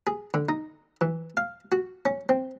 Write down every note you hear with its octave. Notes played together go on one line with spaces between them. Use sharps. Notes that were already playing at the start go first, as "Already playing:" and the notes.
G#4
D3
D#4
E3
F5
F#4
C#4
C4